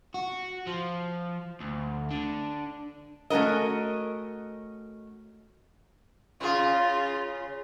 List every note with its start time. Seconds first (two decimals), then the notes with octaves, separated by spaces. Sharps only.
0.14 F#4
0.67 F3
1.60 D2
2.11 D3
3.30 A3 C#4 F#4 A#4 D#5
6.41 C#3 F4 G#4